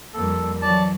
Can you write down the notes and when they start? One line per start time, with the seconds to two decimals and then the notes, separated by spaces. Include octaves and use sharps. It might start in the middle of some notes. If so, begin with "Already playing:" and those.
0.14 F2 G3 A#3 A4
0.62 E3 F#3 D5 A5